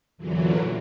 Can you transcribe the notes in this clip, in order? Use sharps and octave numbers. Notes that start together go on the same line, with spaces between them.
E2 A#2 D3 E3 F#3